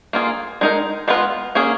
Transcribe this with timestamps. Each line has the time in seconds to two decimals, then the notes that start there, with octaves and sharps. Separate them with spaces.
0.13 A#3 F4 G#4
0.61 G#3 D#4 A#4
1.08 G#3 B3 F4 B4
1.55 A#3 C#4 G#4